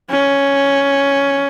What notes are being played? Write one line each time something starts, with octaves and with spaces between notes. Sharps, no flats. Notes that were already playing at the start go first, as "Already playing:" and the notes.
C#4